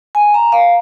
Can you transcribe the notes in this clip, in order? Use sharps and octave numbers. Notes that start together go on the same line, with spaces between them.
G#5
A#5
F5